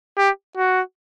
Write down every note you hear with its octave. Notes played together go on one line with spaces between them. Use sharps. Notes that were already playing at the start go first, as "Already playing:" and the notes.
G4
F#4